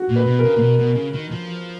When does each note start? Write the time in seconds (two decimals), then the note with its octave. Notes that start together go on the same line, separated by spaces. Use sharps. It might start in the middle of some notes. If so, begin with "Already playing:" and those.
Already playing: F#4
0.09 A#2
0.16 B4
0.26 B2
0.39 A#4
0.44 C#3
0.57 A#2
0.62 B2
0.79 B2
0.96 C#3
1.14 D#3
1.31 F3